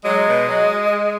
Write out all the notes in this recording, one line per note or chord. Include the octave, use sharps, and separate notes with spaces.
F#3 G#3
B2
F#3